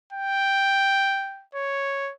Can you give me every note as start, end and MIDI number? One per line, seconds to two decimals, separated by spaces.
0.13 1.44 79
1.55 2.11 73